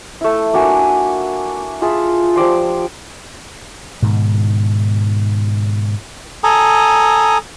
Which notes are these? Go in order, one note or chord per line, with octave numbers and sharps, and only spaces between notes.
A3 E4
A#3 D4 F#4 G#5
F4 G#4 E5 A5
F3 G4 D5 C6
G#2 B2 D#3
A4 G#5 A#5 D#6